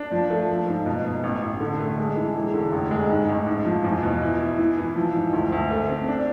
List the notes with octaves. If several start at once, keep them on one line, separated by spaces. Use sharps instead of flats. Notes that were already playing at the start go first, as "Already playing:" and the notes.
Already playing: D4
F3
A3
F3
G#2
B2
B2
A1
A1
D3
A3
G#3
E3
E1
D3
F1
G#3
G#2
A1
G#2
F3
E2
B2
E4
E4
E3
E3
F3
G#2
D2
D2
A3
C4
D4